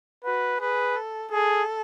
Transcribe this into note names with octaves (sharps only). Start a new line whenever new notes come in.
F#4 B4
G#4 B4
A4
G#4 A4